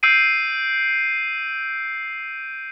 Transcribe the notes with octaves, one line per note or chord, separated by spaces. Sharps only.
E6 G6 C7 D7 D#7